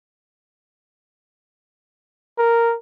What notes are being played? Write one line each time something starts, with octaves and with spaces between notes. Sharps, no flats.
A#4